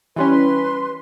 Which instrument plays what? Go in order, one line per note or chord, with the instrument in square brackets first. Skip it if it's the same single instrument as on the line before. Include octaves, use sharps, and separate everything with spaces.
[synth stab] E3 G3 C#4 [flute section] B4 C6